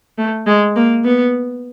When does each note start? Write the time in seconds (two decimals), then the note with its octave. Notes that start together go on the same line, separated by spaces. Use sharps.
0.18 A3
0.46 G#3
0.76 A#3
1.04 B3